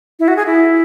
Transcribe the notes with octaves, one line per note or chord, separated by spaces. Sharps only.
E4
F#4
G#4
E4